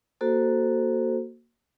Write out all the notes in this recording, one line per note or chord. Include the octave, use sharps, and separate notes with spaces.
A#3 F#4 A4 C5